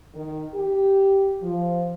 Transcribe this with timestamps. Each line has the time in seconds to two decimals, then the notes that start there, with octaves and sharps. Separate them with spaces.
0.15 D#3
0.54 G4
1.42 F3